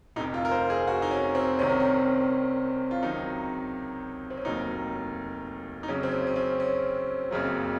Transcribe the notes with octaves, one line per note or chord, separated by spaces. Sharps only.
F1 F2 C3 D#4
F4
A#4
C5
G#4
F#4
D#4
C#4
C4
C2 C3 D#3 C#4
C4
C#4
F4
C#2 C3 D#3 F#3 D#4
C4
C#4
F1 D#2 D#3 F#3 D#4
D#4
F2 C#3 F#3 C#4
C4
C#4
C#4
C4
C#4
F#1 F2 C#3 F#3